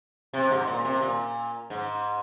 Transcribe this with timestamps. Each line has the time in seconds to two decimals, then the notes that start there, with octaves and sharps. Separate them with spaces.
0.34 C3
0.50 G#2
0.67 A#2
0.85 C3
1.01 A#2
1.70 G#2